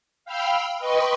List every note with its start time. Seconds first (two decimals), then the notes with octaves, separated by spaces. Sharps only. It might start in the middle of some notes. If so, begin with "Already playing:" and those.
0.25 F5 G5 B5 E6 F6
0.79 B4 D#5 G5 C6 C#6